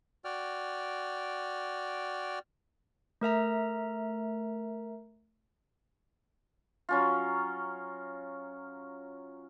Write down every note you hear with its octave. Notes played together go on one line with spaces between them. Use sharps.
F#4 D5 G5 F6
A3 A#4 E5 A#5
F#3 C#4 F4